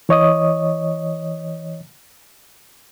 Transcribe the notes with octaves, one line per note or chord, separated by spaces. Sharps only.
E3 C#5 D#5 D#6